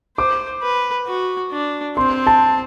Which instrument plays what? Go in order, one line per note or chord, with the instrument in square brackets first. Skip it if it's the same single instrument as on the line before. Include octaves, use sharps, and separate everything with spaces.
[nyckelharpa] C5 [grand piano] D6
[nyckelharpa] B4
F#4
D4
[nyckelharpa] C4 [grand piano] C6
[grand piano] A5